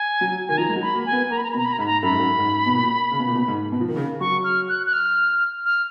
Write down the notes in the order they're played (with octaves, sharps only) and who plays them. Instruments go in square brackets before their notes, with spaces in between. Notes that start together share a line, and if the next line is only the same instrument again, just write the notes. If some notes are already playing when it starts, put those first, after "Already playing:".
Already playing: [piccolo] G#5
[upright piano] F#3
[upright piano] D#3 [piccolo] G#5
[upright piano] F3 [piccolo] A#5
[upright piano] G#3
F#3
[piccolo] B5
[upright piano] A#3
[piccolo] G#5
[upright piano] B3
[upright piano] A#3 [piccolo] A#5
[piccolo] B5
A#5
B5
[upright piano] B2
[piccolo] A#5
B5
A#5
[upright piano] G#2 [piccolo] B5
[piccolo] A#5
[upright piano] F#2 [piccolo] B5
[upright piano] G#2
F#2
G#2
B2
A#2
C#3
B2
A#2
B2
G#2
B2
F3
D#3
C#3
[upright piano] F#3 [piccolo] C#6
[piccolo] F6
F#6
F#6
F6
F6